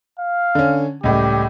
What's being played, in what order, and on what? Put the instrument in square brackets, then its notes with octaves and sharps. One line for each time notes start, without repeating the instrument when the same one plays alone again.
[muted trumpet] F5
[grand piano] D3 C#4
[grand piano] C#2 A2 G3 [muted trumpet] G4